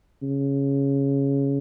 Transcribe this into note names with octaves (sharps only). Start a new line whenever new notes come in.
C#3